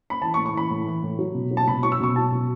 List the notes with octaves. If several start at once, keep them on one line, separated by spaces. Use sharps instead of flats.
B5
E3 A5
C#6
A2
C#6
E3 B5
A2
E3
A2
F#3
B2
F#3
A5
B2 B5
F#3 C#6
E6
B2 C#6
F#3 A5
B2